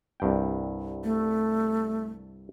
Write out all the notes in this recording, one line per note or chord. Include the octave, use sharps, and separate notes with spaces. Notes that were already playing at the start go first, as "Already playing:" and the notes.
C2 G2 G5
A3